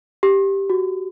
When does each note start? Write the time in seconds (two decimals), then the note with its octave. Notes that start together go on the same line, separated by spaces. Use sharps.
0.23 G4
0.70 F#4